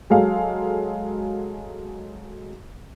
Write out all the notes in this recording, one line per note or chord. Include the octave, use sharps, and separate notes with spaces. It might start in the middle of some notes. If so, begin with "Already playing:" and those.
F#3 G#3 A4 F5